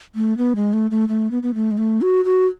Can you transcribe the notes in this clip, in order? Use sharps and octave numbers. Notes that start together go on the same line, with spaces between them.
A3
B3
G#3
A3
A3
A3
B3
B3
A3
G#3
A3
F#4
F#4